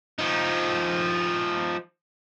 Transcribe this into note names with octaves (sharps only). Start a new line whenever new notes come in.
F3 D#4